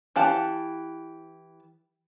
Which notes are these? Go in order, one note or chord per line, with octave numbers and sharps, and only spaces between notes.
E3 G4 F5 F#5 A5